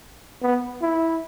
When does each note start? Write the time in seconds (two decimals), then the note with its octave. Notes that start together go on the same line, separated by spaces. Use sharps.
0.43 B3
0.82 E4